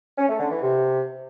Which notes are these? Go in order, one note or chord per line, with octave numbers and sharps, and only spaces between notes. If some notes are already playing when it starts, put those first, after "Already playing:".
C#4
A3
D3
E3
C3